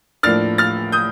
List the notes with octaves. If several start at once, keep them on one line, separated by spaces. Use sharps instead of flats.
A2 F3 A#3 D4 F6 A6
F6 A6
D#6 G6